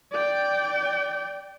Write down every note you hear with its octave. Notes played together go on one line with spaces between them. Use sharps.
D5 G5